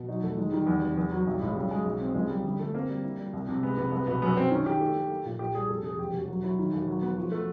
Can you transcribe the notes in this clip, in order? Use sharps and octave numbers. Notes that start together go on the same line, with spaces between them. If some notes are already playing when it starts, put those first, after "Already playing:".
Already playing: B2
F#3 D#4
E2 A3
D#3 G#3
D#3 G3
E2
F1
E2
F#3
B1 G3
A2 G#3
C#3 G3
F#3 G#3
B1
C4
C#2 G#3
G3 A#3
G1 G3
G1 A3
A#3 C4
G3
E4
G3
C2
C3
G#3 B3
C3 B3
C2 B3
B2 B3
F#2 B3
F#2 C4
D#3 C#4
D#3 G4
A3
A3
A#3
A#2
A#2 G4
G3 G#4
F1 A4
F1 G#4
E1 G4
E1 F#4
F#3
F#3 E4
D#3
E1
F#3
B3
F3 F#4
A3